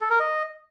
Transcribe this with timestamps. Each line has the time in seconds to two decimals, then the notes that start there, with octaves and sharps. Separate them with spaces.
0.01 A4
0.10 A#4
0.20 D#5